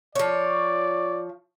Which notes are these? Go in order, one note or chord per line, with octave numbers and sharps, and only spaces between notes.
F3 C#5 D5